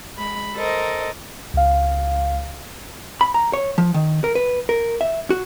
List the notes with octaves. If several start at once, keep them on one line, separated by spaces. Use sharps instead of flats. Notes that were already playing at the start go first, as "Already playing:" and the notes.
G#3 B5
A4 A#4 C5 D#5
C#2 F5
B5
A#5
C#5
F3
D#3
A#4
B4
A#4
E5
F#4